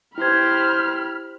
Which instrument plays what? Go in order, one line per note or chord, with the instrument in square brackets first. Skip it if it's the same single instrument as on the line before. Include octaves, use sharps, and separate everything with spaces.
[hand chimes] E4 G#6 [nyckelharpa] G4 C5 [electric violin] B5 F6